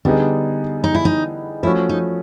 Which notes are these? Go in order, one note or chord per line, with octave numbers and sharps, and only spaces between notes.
D3 G3 B3 D4 D#4 G#4
D#4
E4
D#4
F3 A3 C#4 E4 F#4
D#4